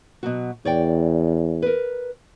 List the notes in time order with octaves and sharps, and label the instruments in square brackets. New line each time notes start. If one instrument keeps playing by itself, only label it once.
[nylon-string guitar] B2 F#3 F#4
[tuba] E2 [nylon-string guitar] C#5 D5 G5
[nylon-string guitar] A#4 B4